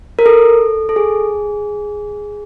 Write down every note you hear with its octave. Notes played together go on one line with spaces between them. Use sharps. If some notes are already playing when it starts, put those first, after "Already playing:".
A#4
A4
A4
G#4